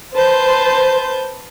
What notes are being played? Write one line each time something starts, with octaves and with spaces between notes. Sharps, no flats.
B4 C5 A5 G6